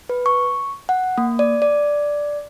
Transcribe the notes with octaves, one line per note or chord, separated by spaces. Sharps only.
B4
C#6
F#5
A#3
D5
D5